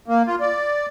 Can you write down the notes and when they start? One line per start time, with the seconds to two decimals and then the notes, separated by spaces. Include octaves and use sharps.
0.08 A#3
0.27 F4
0.40 D5